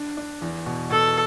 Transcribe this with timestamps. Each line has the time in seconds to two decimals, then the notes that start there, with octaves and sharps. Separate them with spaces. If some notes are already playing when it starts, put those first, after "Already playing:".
Already playing: D4
0.17 D4
0.42 E2
0.66 B2
0.90 B2 A4